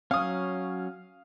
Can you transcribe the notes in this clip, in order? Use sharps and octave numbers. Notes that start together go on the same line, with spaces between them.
F#3 C#4 F5 D#6